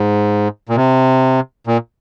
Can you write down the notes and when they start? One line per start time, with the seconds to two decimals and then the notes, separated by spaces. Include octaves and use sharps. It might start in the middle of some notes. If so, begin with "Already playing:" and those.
Already playing: G#2
0.69 A#2
0.76 C3
1.67 A#2